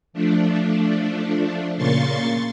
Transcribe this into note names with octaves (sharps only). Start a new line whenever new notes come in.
F3 A3 D4
A#2 C#3 A#3 C6 C#6 A6